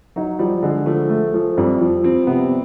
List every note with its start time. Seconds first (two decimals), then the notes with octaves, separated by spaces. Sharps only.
0.16 F#3 D#4
0.39 F3 G3
0.63 D3 G#3
0.86 F3 A3
1.09 A3
1.34 F3
1.57 F2 G3
1.81 F3
2.03 F3 C4
2.27 C3 B3